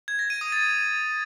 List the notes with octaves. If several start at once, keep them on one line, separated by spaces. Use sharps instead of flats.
G#6
A#6
D#7
D#6
A6